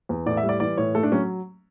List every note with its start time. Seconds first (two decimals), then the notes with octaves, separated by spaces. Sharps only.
0.09 E2
0.26 A2 D5
0.37 E5
0.43 G3
0.49 D5
0.60 E3 D5
0.78 A2 C#5
0.95 A3 A4
1.03 D4
1.12 F#3 C#4